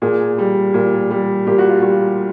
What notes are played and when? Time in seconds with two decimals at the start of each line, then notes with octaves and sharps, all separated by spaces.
0.02 A#2 G#4
0.38 G3
0.74 A#2
1.10 G3
1.47 A#2 G4
1.58 F#4
1.69 F4
1.81 G3 F#4